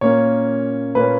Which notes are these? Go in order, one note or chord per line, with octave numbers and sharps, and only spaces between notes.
A#2 A#3 C#4 C#5
A#2 A#3 C#4 B4